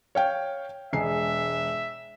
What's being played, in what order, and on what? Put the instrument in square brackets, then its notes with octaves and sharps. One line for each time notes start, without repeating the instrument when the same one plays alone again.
[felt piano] C#5 F5 G5
[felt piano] E1 G#3 C7 [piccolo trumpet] E5